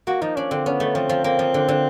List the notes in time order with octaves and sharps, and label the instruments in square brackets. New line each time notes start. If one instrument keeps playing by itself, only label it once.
[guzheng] A#3 [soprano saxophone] F#4
[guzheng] F3 [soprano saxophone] D#4
[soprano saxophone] C#4 [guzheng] D4
[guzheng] D3 [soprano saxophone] C4
[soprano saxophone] B3 [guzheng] C#4
[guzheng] A3
[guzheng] F3 [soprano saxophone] C4
[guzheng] F3
[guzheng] A#3 [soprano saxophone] C4
[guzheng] F3
D3
D3